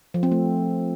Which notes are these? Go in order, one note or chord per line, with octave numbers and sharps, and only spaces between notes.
F3
C4
A3